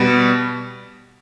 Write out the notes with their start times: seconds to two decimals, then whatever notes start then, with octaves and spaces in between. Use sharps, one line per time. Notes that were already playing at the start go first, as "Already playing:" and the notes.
Already playing: B2 G3 B3